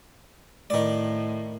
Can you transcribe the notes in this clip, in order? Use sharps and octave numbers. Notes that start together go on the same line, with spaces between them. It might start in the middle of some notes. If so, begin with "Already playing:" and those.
A2 D#3 D5